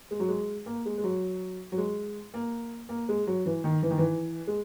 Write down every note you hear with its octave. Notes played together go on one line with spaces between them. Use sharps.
G#3
F#3
G#3
A#3
G#3
G#3
F#3
F#3
G#3
A#3
A#3
G#3
F#3
E3
D#3
E3
D#3
E3
G#3